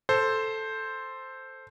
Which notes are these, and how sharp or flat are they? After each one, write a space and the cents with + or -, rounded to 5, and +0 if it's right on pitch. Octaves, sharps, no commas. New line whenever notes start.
A4 +0 C5 +0